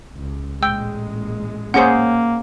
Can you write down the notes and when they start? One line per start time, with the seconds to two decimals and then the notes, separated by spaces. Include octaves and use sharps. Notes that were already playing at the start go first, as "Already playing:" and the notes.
0.14 C#2
0.63 A1 A#2 G#3 G5 E6
1.74 A#3 C#4 G#4 C5 F#5 C#7